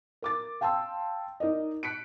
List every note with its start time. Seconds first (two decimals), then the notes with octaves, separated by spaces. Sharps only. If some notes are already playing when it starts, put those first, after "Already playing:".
0.22 A#4 D6 A6
0.61 F5 G5 A5 C6 E6
1.40 D#4 A#4 D5 D#5
1.83 F#6 B6 C#7 D7